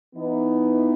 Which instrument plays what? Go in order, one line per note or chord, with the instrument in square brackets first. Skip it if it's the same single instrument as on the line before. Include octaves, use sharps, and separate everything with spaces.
[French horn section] E3 B3 D#4